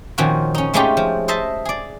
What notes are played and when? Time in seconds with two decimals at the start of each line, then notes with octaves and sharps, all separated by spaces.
0.18 A#2 D#3 F3 C#4 F#4
0.55 C#4 D#4
0.74 G#3 A3 C#4 D#4 F4 G4
0.97 F3
1.28 A4 C5 D#5 E5 A5
1.65 G#4 D5